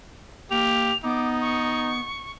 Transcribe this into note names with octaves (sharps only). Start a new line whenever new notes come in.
A#3 G4 F7
B3 D#4 D6
C#6